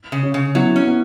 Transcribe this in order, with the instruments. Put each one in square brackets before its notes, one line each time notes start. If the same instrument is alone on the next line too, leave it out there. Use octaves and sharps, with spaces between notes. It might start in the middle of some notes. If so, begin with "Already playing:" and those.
[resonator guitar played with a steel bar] C#3
[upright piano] C#4
[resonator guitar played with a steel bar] C#3
[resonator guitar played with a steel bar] F#3 [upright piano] B3 E4
[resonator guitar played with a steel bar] C#4
[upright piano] B3